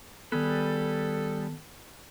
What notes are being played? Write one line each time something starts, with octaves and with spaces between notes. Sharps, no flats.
D#3 G3 B3 G#4 A4 B4